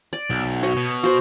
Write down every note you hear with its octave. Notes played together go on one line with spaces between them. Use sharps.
D5
B1
F#4 C#5 D#5
B2
F#4 C5